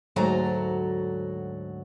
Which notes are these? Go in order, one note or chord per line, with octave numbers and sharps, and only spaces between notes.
D2 G#2 F#3 F#4 A4 A#5